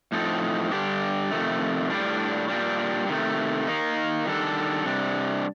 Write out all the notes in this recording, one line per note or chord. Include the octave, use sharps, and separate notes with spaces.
A2 F3 C4 D#4 A4
G2 D3 G3 D4 G4
F2 C3 D#3 A3
A2 G3 D4
A#2 G3 D4
C3 D#3 A3
D#3 A#3 D#4
D#3 G3 D4 A4
C3 G3 D4